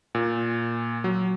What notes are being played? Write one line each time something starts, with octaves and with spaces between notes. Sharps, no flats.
A#2
F#3